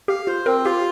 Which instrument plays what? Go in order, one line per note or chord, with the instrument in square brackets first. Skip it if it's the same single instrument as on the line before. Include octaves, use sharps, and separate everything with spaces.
[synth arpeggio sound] G4 [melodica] F5
[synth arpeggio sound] F4 [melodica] C5
[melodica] C4 [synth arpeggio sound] A#4
[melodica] F4 [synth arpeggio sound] G4